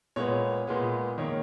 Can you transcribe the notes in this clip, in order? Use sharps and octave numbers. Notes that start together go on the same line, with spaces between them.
A#2 G#3 B3 C#5
A#2 G#3 B3
D#3 A#3 C#5